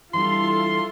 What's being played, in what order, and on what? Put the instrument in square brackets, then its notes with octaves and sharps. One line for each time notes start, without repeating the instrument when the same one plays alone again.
[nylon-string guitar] E3 G3 D4 [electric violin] F4 A4 [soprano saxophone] C6